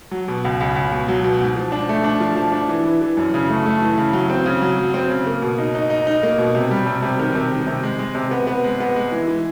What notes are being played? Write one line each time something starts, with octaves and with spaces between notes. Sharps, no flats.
F#3
B2
C#2
C#2
C#2
B2
F#3
B2
G#2
F3
D4
A3
D4
F3
F3
D4
E3
E3
E3
F#2
C#3
A3
A3
E3
C#3
F#3
C4
C#3
F#3
F#3
C4
C#3
A#3
B2
D#4
D#4
D#4
D#4
A#3
B2
C3
G3
C3
C3
D#3
C3
D#3
C3
G#3
G#3
C3
B3
B3
G#3
B3
G#3
E3
E3